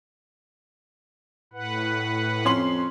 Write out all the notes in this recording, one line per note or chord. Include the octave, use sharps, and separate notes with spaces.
A2 B4 F#5
F2 C#4 C6 F#7